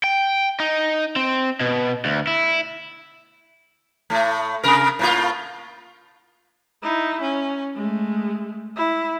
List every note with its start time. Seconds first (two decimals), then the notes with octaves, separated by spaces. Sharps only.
0.04 G5
0.60 D#4
1.16 C4
1.60 B2
2.05 D2
2.27 E4
4.10 A2 A3
4.63 C3 A#4
4.99 A2 A#3 F4
6.83 D#4 E4
7.21 C#4
7.75 G#3 A3
8.76 E4